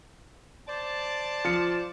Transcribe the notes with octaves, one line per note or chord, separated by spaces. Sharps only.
C5 D5 A5
F3 C#7